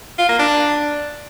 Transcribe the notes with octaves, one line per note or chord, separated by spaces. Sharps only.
F4
A#3
D4